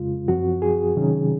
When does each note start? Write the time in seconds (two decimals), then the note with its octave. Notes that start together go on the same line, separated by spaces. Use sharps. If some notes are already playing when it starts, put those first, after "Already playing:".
Already playing: F2 C#3 G#3 F4
0.28 F#2 F3 C4 F#4
0.62 G#4
0.96 C3 D#3 F#3 C#4